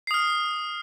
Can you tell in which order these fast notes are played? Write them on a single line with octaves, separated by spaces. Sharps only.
C7 D#6 F6